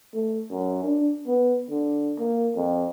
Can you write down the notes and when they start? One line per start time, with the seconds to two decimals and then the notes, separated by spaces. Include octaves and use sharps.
0.14 A3
0.51 F#2
0.84 D4
1.27 B3
1.70 D3
2.18 A#3
2.56 F2